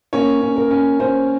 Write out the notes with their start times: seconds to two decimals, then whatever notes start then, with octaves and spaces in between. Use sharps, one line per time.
0.13 A#3 C#4 C#5
0.42 C#4
0.57 A#4
0.71 C#4
1.00 C#4 C5